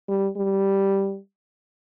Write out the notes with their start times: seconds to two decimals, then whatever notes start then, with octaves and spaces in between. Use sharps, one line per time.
0.08 G3
0.37 G3